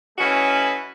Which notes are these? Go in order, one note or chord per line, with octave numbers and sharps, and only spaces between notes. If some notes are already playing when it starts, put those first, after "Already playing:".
E3 A3 C#4 F#4 B4 D#5